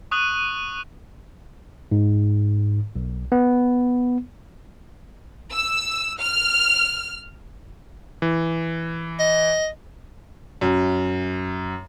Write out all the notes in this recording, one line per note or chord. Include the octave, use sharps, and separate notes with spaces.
C#6 D#6 F#6 D#7 F#7
G#2
B1
B3
E6
F6
E3
D#5
F#2